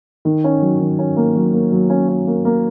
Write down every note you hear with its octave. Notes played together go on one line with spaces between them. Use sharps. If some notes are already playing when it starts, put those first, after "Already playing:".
D#3
C#4
F#3
D#3
C#4
A#3
F#3
A#3
F#3
C#4
C#4
A#3
A#3